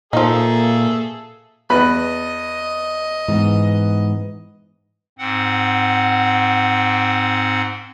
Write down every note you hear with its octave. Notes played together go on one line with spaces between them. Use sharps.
A#2 F3 A#3 D#4 G#4 A4 E5
E2 B4 D#5 B5
G#2 E3 B3
G#2 C4 F#5